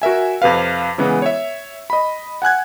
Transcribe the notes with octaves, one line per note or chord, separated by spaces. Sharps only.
F#4 A#4 E5 G#5
F2 C3 B4 F5
C#3 E3 G#3 B3
C#5 E5
D#5 B5
F#5 G#5 F#6 G#6